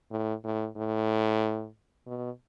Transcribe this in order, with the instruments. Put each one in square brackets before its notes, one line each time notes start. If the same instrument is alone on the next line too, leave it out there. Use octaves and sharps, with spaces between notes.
[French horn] A2
A2
A2
B2